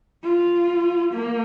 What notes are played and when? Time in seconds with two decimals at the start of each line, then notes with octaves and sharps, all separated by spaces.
0.24 F4
1.14 A#3